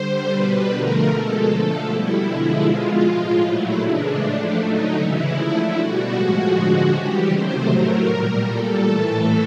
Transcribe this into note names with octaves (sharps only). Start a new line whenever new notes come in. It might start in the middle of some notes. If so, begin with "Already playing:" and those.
Already playing: D3 G3 C5
B2 G3 B4
D3 F3 A3 A#4
B2 G#3 A4
D3 F3 A3 A4
B2 G3 E4
D3 F3 G#3
B2 G#3 F4
A2 F3 G#3
A#2 F#3 A3 E4
C#3 E3 G#3 D4
A2 F3 A3
D3 F#3 A3 D#4
C#3 E3 G#3 E4
D3 F3 A3
B2 G3 F#4
A2 F3 G#3
D3 F3 G#3
C#3 E3 G3 G4
C3 D#3 F#3 A3 C5
A2 F#3 A3 A#4
A#2 G3
A#2 G3 A4
A2 E3 A3